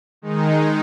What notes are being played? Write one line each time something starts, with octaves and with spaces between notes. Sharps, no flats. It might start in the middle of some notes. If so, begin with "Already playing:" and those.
D#3 G#3 D#4